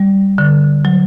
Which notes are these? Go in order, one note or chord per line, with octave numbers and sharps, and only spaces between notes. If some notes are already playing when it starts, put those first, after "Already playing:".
Already playing: G3
D3
F#3